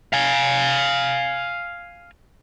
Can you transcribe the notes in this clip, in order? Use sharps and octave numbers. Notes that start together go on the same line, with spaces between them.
F5 G#5